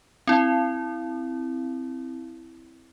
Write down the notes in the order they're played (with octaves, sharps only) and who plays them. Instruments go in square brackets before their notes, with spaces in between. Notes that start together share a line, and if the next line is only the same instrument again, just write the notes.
[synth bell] C4 E4